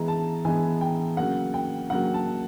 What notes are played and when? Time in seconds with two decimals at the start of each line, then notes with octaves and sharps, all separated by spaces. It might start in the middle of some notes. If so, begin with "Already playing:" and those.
Already playing: E3 G#3 B3 A#5
0.08 A5
0.45 E3 G#3 B3 G#5
0.81 G5
1.17 C#3 F#3 A#3 F#5
1.54 G5
1.90 C#3 F#3 A#3 F#5
2.14 A5